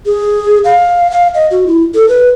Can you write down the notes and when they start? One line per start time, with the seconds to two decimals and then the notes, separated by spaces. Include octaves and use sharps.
0.06 G#4
0.65 F5
1.11 F5
1.34 D#5
1.51 F#4
1.67 E4
1.95 A4
2.08 B4